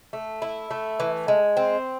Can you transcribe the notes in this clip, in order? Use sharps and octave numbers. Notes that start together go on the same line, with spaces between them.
A3
E4
A3
E3
G#3
C4